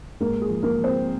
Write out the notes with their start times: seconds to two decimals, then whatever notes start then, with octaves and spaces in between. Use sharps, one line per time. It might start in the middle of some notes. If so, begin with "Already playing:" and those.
0.21 G#2 A#3 A#4
0.41 G#4
0.49 F3
0.62 A#3 A#4
0.77 F3
0.84 C4 C5